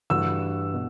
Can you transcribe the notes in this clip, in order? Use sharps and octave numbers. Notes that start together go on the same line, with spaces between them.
G2 E3 A3 D4 F#4 E6
B2